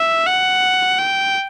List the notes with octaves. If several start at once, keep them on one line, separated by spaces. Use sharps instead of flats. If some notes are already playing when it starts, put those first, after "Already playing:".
Already playing: E5
F#5
G5